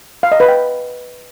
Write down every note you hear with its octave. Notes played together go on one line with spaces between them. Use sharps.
F5
D#5
B4
G5